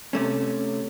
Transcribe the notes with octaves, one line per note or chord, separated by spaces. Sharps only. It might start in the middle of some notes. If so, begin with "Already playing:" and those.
C3 A3 C#4